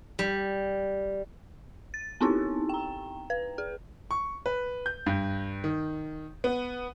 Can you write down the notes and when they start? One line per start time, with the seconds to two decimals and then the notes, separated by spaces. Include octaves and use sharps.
0.19 G3
1.94 A6
2.21 B3 C4 D#4 E4 G4
2.69 G5 A#5
3.30 B4
3.58 G#4
4.11 C#6
4.46 B4
4.86 G6
5.06 G2
5.64 D#3
6.44 B3